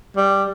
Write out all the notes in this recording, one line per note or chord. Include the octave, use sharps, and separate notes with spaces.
G3